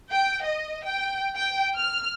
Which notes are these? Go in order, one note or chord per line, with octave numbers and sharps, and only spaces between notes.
G5
D#5
G5
G5
F6